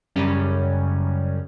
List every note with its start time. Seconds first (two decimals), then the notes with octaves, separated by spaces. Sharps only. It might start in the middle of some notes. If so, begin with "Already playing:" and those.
0.16 F#2 C#3 G3 C#4